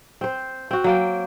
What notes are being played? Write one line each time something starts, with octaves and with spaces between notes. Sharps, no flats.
C4 C5
C4 F#4
F#3 A#3 G5